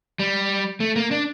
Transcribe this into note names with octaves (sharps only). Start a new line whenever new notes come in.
G3
A3
A#3
D4